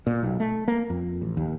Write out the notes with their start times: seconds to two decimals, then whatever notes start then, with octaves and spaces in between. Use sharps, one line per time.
0.07 A#2
0.23 B1
0.40 A3
0.68 A#3
0.90 F2
1.22 A1
1.37 D#2